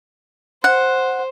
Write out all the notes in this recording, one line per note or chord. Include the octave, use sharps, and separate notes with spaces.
C5 F#5